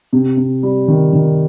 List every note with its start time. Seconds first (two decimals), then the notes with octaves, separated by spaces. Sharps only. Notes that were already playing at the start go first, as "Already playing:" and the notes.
0.13 C3
0.37 C3
0.63 G3
0.88 D#3
1.13 D#3